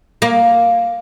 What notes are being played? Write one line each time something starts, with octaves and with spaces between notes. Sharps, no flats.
A#3